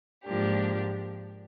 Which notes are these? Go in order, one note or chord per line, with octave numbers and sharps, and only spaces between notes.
G#2 F3 A#3 D4 G4